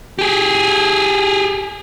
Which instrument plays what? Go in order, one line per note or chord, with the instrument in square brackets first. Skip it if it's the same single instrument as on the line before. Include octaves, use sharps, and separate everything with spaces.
[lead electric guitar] G4 G#4